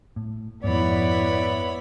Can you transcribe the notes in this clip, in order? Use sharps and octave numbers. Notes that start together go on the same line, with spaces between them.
A2
F2 G#2 B3 E4 C#5 D5 B5